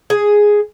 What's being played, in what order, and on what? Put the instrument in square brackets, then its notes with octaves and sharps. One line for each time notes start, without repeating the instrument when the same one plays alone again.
[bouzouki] G#4